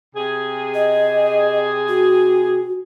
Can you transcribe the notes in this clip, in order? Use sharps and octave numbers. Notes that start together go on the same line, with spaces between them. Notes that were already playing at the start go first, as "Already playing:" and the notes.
C3 G#4
D#5
F#4